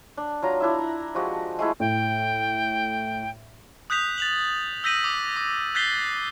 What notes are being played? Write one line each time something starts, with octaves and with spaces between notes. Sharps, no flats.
D4
F#3 F4 A#5
D4 E4 E5
A#5
F3 G#3 F#4 G4
G#3 A3 E4
A2 G5
D#6 F#6 G6 B6 F7
A6 F7 F#7
E6 G6 A#6 B6 D#7 F#7
D6
D6
F#6 G6 A6 B6 C7 G7